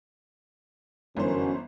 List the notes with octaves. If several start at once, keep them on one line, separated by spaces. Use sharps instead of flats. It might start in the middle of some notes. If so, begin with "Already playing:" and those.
G1 F#2 D3 E3 C#4 C5